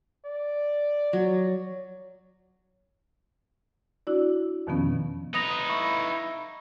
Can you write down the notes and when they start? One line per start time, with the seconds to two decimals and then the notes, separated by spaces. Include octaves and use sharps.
0.25 D5
1.13 F#3
4.07 D4 E4 F#4 D5
4.67 F2 B2 D#3 F3 B3 C#4
5.34 D#4 B4 D#6 A#6 F7
5.69 E4 C#6